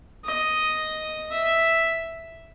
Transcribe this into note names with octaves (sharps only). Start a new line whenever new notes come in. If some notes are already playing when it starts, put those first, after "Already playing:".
D#5
E5